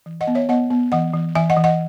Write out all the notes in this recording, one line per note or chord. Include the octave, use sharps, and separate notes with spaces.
E3
D#5 F#5
B3
C#5 E5
B3 D#5 F#5
B3
E3 D#5 F#5
E3
E3 E5 G#5
D#5 F#5
E3
D#5 F#5